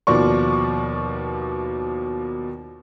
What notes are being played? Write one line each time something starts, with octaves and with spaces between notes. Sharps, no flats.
D#2 B2 F3 D5 C#6